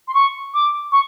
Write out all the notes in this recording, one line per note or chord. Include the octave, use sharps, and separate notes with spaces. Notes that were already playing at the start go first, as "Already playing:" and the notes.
C6
C#6
D6
C#6